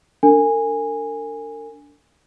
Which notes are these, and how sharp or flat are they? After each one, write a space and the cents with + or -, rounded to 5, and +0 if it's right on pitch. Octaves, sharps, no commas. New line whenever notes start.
D4 -15 A#4 -45 G#5 -15